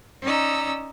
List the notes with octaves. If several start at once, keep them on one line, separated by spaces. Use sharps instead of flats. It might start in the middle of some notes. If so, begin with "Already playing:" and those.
C#4 D#4 D5 D#5 A#5 E6